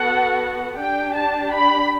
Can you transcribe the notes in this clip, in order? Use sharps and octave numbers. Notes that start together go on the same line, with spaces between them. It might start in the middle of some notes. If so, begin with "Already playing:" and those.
Already playing: B3 F#4 A4 F#5
D4 G4 G5
A5
B5